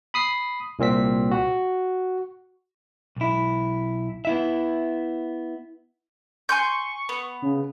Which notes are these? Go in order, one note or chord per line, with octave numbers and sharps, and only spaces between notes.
B5 D#6 C7
C2 A#2 C4 B6
F#4
B1 E4
B3 E4 E5
G#5 C6 C#6 G6
B3
C#3